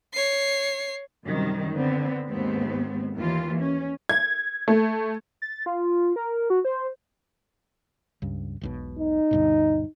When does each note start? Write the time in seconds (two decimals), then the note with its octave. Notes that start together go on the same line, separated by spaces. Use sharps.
0.13 C#5 C7
1.26 F#2 C3 D#3 G3
1.72 D3 B3 C4
2.28 D#2 G#2 B3 C4
3.16 D#2 E3 F4
3.60 C#4
4.09 G#6
4.68 A3
5.42 A6
5.66 F4
6.16 A#4
6.50 F#4
6.65 C5
8.22 C#2 G2
8.61 E1 B1 B2
8.99 D#4
9.31 D2 G2 B2